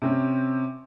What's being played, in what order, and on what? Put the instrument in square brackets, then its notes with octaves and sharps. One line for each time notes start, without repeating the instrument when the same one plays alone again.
[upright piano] C3 C4 C#4